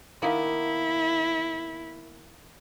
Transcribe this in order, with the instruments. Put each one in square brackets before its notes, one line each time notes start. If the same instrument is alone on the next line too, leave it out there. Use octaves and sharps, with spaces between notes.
[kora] D#3 A#3 B3 [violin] E4